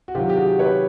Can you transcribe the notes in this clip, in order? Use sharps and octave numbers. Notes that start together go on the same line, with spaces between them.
F#4
C3 D#3 F#3 F4 G4
G4
F#4 G#4
B4 C#5